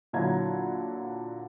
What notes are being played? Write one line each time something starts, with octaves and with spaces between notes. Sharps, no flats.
A#2 D3 F#3 E4 A#5 G#6